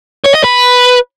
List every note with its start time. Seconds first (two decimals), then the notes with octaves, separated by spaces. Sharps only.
0.24 C#5
0.34 D#5
0.44 B4